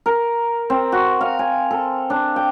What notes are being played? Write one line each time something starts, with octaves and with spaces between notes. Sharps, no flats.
A#4
C4
F#4
F5
G#5
A4
D4
G5